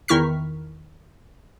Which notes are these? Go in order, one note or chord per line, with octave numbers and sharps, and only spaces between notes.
E2 D#3 E4 C#6 F6 B6